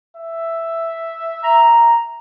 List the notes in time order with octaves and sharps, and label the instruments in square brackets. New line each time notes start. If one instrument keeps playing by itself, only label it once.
[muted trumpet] E5
[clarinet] A#5